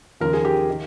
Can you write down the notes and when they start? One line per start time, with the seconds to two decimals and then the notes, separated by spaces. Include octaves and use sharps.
0.20 D#2 C#3 F3 A#4
0.33 G#4
0.45 G4
0.70 D#3